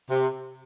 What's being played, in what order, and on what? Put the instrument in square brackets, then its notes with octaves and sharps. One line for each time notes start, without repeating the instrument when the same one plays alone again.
[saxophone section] C3